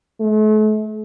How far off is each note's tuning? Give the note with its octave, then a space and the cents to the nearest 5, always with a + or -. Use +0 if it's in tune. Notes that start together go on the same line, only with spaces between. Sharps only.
A3 -40